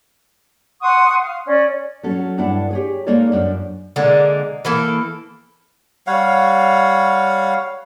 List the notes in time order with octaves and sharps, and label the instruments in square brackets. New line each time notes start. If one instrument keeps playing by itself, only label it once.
[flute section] F#5 C6 C#6 D#6
F5
C#4 D5
[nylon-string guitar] F#3 C#4 A4
G2 D4 E4 A4 F#5
G4 G#4 C#5
G#3 A#3 D#4 A4 C#5 D5
F#2 D4
[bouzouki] D3 G#3 A#3
E3 A#3 A4
[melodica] G3 C#5 F5 F#5